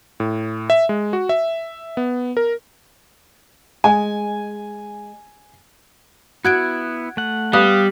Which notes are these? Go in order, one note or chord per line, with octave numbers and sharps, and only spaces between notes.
A2
E5
G#3
F#4
E5
B3
A#4
G#3 G#5
B3 E4 F#4 F#6 G#6 D7
A3 F#5
G3 B3 F5 D#6 F#6